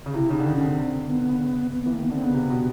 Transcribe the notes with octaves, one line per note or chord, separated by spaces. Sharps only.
C#3
C3 E4
C#3 D#4
D3
D#3 D#4
C#4
D3
C4
D3
D3
D#3 B3
D3
D3
C#3
B3
E3 B3
A#3
D#3 B3
D3 C4
C#3 B3
C3
B2